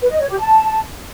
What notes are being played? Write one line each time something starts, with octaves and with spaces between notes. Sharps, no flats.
B4
D#5
C#5
G4
A5